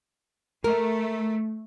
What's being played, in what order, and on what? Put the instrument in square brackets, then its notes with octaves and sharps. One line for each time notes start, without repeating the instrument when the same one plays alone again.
[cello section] A3 [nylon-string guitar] A#4